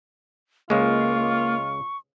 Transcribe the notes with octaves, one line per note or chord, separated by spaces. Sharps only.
C#2 G#3 A#3 F4 C#6